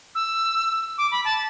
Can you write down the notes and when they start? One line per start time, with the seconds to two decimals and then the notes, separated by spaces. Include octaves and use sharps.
0.15 E6
0.98 D6
1.11 B5
1.25 A5